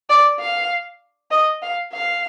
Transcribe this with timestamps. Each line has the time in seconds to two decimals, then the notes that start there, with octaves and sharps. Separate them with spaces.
0.09 D5
0.39 F5
1.31 D#5
1.62 F5
1.93 F5